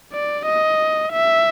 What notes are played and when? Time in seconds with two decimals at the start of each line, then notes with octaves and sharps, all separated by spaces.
0.13 D5
0.46 D#5
1.13 E5